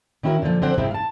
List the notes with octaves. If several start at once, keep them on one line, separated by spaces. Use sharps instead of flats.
D#3 C#4 E4 F#4 A#4
A#2 D3 D#3 F3
D3 F3 C4 C5 F#5
G#2 C3 G#3 C4 E4
F5 A5